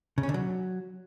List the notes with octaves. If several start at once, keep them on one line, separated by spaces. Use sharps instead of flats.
C#3
C#4
D3
F#3